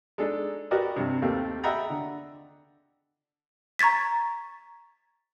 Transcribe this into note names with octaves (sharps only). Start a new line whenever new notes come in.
G#3 D4 D#4 A4
F#4 G4 A#4 B4 D5 D#5
G2 C3
D#2 A3 A#3 C4 G4
D#5 E5 F#5 G5 A#5 B5
D3
A#5 C#6 G#6 A6 B6